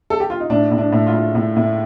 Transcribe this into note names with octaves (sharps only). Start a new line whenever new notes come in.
A4
G4
F4
D#4
A2 D4
A2
D4
A2
F4
A2
A2
A2